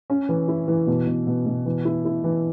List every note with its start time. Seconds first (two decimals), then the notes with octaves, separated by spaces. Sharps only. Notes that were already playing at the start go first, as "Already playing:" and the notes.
0.10 C#4
0.29 E3
0.48 E4
0.68 E3
0.87 B2
1.07 B2
1.27 B2
1.46 B2
1.66 E3
1.85 E4
2.05 E4
2.24 E3